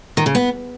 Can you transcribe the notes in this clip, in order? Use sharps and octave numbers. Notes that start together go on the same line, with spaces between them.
D#3
C#3
B3